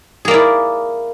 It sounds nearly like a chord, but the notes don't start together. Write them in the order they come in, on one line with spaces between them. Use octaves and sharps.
G#4 A#3 D5 E4